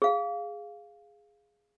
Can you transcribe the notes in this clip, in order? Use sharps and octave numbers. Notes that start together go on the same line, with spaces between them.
G#4 F5